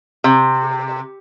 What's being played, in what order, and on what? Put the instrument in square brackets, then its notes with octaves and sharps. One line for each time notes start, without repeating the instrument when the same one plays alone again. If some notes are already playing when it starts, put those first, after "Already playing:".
[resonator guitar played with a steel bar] C3